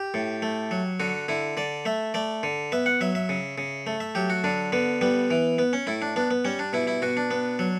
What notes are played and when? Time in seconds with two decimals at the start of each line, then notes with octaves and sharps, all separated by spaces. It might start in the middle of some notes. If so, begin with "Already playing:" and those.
Already playing: G4
0.14 A2
0.42 A3
0.71 F#3
1.00 D3 F#4
1.28 D3 E4
1.57 D3 D5
1.85 A3 E5
2.14 A3 D5
2.43 D3
2.72 B3 E5
2.86 F#5
3.01 F#3 E5
3.15 E5
3.29 C#3
3.58 C#3
3.87 A3
4.00 E5
4.15 F#3 G4
4.30 F#4
4.44 D3 D4
4.72 D3 B3
5.01 G3 B3
5.31 E3
5.58 B3
5.73 C#4
5.87 A2 E4
6.02 D4
6.16 B3 D4
6.31 B3
6.45 G3 C#4
6.59 D4
6.73 B2 E4
6.87 E4
7.02 B2 F#4
7.17 D4
7.31 B3
7.59 F#3